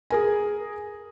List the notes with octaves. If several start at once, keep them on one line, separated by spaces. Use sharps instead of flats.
G#4 A#4 G#5